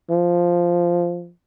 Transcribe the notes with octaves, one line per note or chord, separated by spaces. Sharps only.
F3